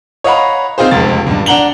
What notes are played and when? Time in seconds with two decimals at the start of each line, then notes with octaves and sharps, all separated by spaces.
0.24 C#5 D#5 F5 F#5 A#5 B5
0.78 C4 D#4 F4 G#4 C5
0.91 F1 C#2 A6
1.26 C#2 G2
1.46 D4 F#5 A#5 F#7 G7